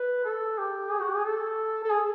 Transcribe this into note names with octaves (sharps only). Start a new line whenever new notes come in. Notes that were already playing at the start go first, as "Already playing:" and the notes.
Already playing: B4
A4
G4
G#4
F#4
G4
G#4
A4
A4
G#4